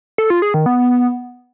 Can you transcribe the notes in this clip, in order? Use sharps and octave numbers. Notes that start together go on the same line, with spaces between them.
A4
F4
G#4
D#3
B3